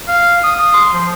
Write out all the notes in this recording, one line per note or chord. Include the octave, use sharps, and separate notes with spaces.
F5
D#6
C6
F3